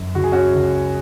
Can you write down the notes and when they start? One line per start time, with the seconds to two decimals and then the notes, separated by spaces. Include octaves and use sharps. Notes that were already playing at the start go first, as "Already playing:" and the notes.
Already playing: F#2
0.15 C#2 F#4
0.24 G#4
0.32 C#4 F#4
0.53 C#2